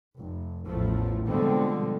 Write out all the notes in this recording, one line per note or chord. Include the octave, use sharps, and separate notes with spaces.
F1
A1 E2 F3 A3
B2 D3 F3 G3 G#3 C4